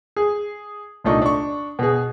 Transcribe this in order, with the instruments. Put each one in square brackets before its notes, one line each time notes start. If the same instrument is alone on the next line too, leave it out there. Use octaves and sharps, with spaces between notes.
[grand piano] G#4
C2 A#2 A3 D4 D#4 C#6
D4 C#6
B2 G#4